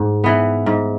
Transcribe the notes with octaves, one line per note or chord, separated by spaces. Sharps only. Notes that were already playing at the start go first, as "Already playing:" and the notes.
Already playing: G#2
E3 B3
G#2